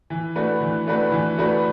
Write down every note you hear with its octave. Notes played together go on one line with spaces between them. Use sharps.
E3
A3 D4 F#4 B4
E3
A3 D4 F#4 B4
E3
A3 D4 F#4 B4